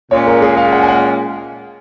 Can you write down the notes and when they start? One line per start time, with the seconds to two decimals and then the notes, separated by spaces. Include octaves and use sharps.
0.11 A#2 G#3 C#4 C#5
0.27 A#4
0.42 G#4
0.57 F5
0.73 F#5
0.83 G#5
0.89 F#5